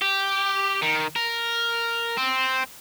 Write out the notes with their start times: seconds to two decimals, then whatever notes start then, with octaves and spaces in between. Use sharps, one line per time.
0.01 G4
0.82 D#3
1.16 A#4
2.17 C4